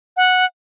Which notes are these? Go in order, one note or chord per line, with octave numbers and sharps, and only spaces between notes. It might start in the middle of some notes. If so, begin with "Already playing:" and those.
F#5